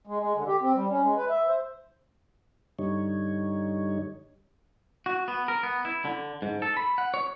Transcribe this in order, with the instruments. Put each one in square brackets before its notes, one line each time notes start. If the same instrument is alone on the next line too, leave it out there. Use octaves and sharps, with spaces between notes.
[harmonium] G#3
G#3
D3
G4
C4
G3
C#4
G#3
B4
E5
C5
[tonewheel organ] G2 D3 G3 D#4 C#5
[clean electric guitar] F#4
B3
A#4
B3
E4
D3
G#2
A4
B5
F#5
C#5